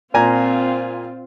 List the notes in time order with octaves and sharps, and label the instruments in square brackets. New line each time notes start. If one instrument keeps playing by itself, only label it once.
[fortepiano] A#2 G#5 A#5 [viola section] C4 F4